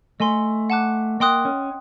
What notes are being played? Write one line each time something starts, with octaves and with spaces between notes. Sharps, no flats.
A3 D#5 G#5 C6
F#5 A5 D6 F#6
A#3 D#5 G5 C6 D#6 F#6
C#4